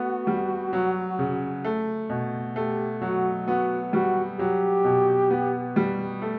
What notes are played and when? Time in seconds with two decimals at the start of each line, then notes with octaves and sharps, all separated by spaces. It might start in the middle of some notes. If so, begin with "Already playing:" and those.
Already playing: A3 B3 F#4
0.27 G3
0.73 F#3
1.19 C#3
1.65 A3
2.10 B2
2.56 A3 G4
3.02 F#3 F#4
3.47 B3 F#4
3.93 G3 F#4
4.39 F#3 G4
4.84 B2
5.30 B3
5.76 G3
6.22 A3